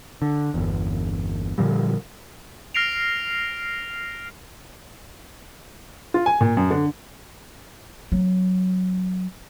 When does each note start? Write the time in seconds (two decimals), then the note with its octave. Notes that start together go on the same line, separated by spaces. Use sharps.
0.22 D3
0.54 G1 E2
1.58 A#2 D3 F3 G3
2.75 F6 A#6 C7 D7 F7
6.14 F4
6.26 G#5
6.41 A#2
6.57 F#2
6.70 D3
8.12 F#3 C4